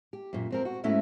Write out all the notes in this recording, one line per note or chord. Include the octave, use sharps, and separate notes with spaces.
G4
F#2 A#2
F2 C4 A#4
F#4
G#2 A3 C#4 E4 F#4 E5